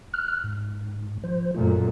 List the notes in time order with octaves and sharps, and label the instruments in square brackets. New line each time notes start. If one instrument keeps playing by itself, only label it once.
[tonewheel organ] F6 F#6
G#2
F3 C5
[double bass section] F#2 A#2 A3 [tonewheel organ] F4